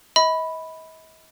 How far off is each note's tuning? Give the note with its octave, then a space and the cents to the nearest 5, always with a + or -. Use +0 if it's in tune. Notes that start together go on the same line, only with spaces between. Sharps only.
D#5 +45 B5 +0